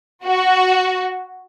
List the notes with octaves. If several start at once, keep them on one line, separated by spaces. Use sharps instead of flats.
F#4